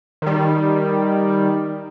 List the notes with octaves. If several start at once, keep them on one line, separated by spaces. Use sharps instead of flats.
D#3 G3